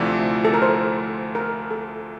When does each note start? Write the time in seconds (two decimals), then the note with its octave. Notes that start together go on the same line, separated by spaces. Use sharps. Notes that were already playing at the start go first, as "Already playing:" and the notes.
Already playing: D2 C3 F3 A3 E4 D5
0.45 A4
0.54 A#4
0.62 C5
1.35 A#4
1.71 A4